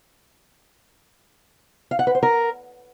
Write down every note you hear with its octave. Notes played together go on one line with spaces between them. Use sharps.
F5
F#5
B4
C5
A#4